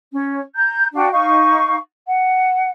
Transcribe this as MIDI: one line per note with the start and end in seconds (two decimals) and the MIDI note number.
0.12 0.38 61
0.54 0.86 82
0.54 0.86 91
0.93 1.07 62
0.93 1.07 66
0.93 1.07 77
0.93 1.07 79
1.12 1.76 63
1.12 1.76 77
1.12 1.76 85
2.07 2.71 78